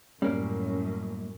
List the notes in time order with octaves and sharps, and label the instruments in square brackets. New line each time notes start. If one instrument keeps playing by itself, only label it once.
[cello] F#2 A2 [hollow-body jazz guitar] G3 A#3 [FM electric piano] C#4